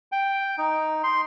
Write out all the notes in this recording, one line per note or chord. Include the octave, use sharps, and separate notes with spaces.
G5
D#4
C6